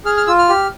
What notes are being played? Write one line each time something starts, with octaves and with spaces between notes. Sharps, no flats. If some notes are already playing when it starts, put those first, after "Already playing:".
G#4 F6
F6
F4 E6
F6
G4